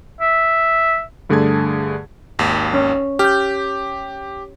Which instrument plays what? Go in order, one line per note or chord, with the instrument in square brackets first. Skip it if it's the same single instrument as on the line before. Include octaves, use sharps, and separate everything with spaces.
[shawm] E5
[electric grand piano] G2 D3 A3 G#4 A5 G#6
G#1 D#2
[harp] C#4
[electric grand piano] G4 [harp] F6 G6